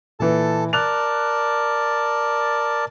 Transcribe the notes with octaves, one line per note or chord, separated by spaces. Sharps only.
A#2 E3 A4 A5
A#4 D5 A5 F#6 F7